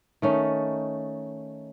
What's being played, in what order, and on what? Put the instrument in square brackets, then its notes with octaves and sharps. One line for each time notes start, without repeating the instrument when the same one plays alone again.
[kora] D#3 A3 C#4 D#4